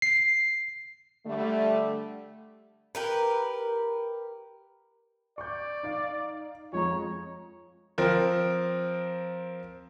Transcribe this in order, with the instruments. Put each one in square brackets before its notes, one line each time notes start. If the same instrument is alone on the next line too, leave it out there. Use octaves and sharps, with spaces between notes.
[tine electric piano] C7
[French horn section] D3 G3 A3
[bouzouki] G4 A#4 B4
[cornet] D5 [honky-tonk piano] C#6 D6 G6
[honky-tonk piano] D#4 F5
[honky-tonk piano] F2 G#3 A#5 [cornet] C#5
[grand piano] F3 C4 A#4